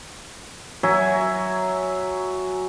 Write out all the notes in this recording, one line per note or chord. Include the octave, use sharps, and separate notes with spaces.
F#3 E5 G#5